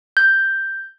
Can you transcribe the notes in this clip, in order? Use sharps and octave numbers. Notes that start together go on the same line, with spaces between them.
G6